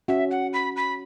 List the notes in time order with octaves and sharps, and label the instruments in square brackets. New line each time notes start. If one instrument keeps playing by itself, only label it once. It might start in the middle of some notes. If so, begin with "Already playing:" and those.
[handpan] C#4 F#4 [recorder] E5
[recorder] F#5
B5
B5